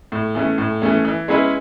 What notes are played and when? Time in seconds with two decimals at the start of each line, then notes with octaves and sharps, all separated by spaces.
0.12 A2
0.35 E3 A3 C#4
0.58 A2
0.82 E3 A3 C#4
1.05 E3
1.28 G#3 C#4 E4 B4